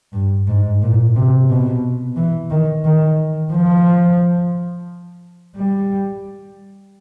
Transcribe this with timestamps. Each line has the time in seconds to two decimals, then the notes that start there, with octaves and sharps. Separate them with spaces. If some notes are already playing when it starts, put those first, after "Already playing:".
0.13 G2
0.48 G#2
0.82 A#2
1.16 C3
1.50 B2
2.16 E3
2.51 D#3
2.85 D#3
3.53 F3
5.56 G3